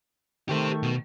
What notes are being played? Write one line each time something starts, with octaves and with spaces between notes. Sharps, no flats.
D#3 A3 G4 C5
B2